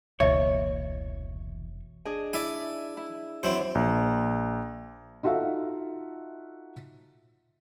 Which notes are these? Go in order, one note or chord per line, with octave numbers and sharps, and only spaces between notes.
F1 C#2 B2 E3 A#3 C#5 D#5 E5
D4 G#4 D#5
E4 D5 E5 G#5
E4
F#2 E3 C4 E4 C5
A#1
D#4 F4 F#4 A4 E5 F5